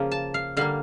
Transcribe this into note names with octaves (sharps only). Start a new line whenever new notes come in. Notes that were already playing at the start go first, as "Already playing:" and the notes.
Already playing: C#3 F3 A#3
A5
F5
D3 G3 A#3 F5